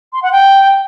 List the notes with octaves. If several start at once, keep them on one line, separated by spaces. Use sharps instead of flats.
C6
F#5
G5